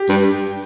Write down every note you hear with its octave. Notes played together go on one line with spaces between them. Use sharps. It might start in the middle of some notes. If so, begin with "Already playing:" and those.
Already playing: G4 G5
G2